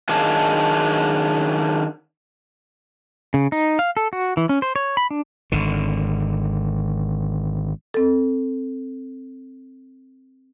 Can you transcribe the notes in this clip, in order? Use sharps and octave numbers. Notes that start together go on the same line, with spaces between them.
D#3 F#3 D4 G#4 F5 A5
C#3
D#4
F5
A4
F#4
E3
C#4
C5
C#5
B5
D4
G#1 D3
C4 A4